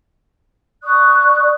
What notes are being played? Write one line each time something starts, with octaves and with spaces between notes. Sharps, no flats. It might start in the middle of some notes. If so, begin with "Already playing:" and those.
D5 C#6 D#6 F#6